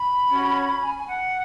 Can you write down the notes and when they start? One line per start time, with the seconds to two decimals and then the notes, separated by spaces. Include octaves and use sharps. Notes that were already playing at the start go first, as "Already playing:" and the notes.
Already playing: B5
0.31 C#4 F#4 C#5
0.82 G#5
0.97 G#5
1.07 F#5